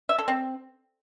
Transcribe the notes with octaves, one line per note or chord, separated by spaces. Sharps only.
E5
A4
C4